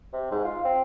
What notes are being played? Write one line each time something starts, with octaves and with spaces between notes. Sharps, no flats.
C3
G#2
F4
C4